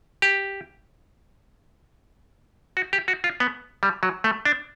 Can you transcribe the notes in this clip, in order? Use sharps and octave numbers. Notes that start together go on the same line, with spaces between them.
G4
F#4
G4
F#4
F4
B3
G3
F#3
A3
D4